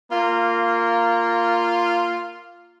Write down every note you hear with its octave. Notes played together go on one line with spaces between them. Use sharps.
A#3 F4